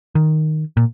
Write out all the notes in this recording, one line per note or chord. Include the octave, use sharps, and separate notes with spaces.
D#3
A#2